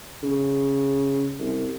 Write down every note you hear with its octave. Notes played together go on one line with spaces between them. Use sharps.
C#3
C2